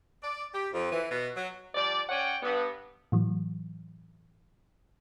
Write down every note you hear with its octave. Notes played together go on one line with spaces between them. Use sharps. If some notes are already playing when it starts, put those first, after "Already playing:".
D5
G4
F2
E3
B2
F#3
F3 G3 D5
C#4 C#5 D5 F#5 G5
G2 B3
A2 E3 F#3